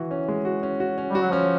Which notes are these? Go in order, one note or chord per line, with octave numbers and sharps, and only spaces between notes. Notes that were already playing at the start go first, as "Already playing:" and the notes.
Already playing: E3 F#4
C#4
G#3
F#4
C#4
F#4
C#4
G3
F#4
F#3
F3 C#4